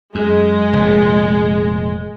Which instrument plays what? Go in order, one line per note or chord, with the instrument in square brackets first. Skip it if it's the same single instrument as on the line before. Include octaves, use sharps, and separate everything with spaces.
[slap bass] F#2 [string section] G#3
[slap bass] F1 A#2